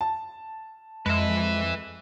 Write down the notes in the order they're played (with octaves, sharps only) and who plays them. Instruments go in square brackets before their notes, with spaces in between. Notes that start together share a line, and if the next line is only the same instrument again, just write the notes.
[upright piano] A5
[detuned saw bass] F2 [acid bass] G#3 [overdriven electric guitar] B4 E5